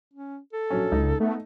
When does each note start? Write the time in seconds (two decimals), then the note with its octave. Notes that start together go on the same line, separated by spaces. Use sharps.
0.14 C#4
0.53 A4
0.70 A#1 F#3 C#4
0.92 C#2 D#4
1.20 A3 B3